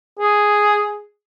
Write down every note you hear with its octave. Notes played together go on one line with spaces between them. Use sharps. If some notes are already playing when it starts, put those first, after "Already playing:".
G#4